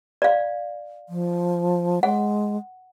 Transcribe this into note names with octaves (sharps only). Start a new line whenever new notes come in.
D5 F5
F3
G#3 F#5